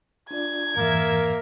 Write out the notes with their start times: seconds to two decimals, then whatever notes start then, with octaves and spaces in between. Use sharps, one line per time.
0.31 D4 F4 D5 G#6
0.77 F2 G#2 E3 A#3 A#4 E5